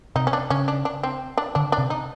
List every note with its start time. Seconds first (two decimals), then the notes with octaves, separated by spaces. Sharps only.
0.16 C3 D#4
0.27 C#4
0.33 D4
0.50 C#3 C#4
0.68 D4
0.85 D4
1.03 C4
1.37 D4
1.55 D3 D4
1.72 D4
1.78 C3
1.90 D#4